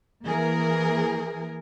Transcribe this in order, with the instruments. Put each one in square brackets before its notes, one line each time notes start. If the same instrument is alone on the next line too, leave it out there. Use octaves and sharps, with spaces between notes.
[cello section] E3 A#3 G#4 A#4